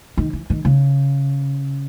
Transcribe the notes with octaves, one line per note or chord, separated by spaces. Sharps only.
D#3
E3
D#3
C#3